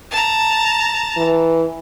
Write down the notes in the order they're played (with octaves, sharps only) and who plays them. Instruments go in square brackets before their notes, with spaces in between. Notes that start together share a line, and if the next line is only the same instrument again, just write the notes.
[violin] A5 A#5
[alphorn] E3